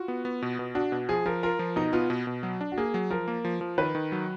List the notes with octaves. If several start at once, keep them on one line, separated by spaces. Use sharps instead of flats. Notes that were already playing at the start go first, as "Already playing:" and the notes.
Already playing: F4 F#4
B3
B3
B2
B2
D4 F#4
B2
F3 G#4
F3 A#4
F4 A#4
F3
B2 D#4
B3 F4
B2
B2
F#3
D4
F#4
A#3 G#4
F#3
F3 A#4
A#3
F3
F3
D#3 B4
D#3
F#3